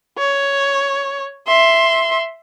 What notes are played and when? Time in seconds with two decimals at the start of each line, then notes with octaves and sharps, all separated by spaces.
0.18 C#5
1.47 E5 C6